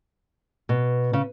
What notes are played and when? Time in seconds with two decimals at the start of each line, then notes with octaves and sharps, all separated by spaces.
0.69 B2
1.13 C#3